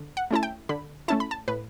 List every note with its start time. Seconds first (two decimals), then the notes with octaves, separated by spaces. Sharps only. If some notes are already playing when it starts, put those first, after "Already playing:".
Already playing: D3
0.17 F#5
0.31 A3 C#4 E4 A5
0.43 G5
0.69 D3 B5
1.08 A3 C#4 E4 A5
1.20 B5
1.31 A5
1.48 A2 B4